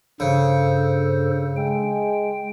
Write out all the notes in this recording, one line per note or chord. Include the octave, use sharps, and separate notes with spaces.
G2 C#3 A4 C5
G#3 G5